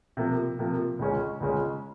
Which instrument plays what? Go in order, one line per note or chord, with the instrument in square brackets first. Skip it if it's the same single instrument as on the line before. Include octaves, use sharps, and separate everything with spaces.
[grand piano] C3 F3 A#3
C3 F3 A#3
C#2 C#3 G#3 C#4
C#2 C#3 G#3 C#4